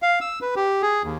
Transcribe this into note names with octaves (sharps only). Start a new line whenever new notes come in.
F5
E6
B4
G4
G#4
D#2